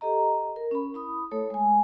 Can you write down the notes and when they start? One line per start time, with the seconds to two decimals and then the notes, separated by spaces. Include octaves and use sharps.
0.01 G4 A4 D#5 A#5
0.56 A#4
0.71 C#4 B5
0.94 E4 B5 D#6
1.31 A3 A4 C#5
1.50 G#3 G#5